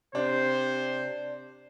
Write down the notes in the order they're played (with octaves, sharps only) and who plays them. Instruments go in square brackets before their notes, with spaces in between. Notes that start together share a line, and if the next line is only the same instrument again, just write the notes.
[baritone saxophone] C3 [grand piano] D4 [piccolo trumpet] C5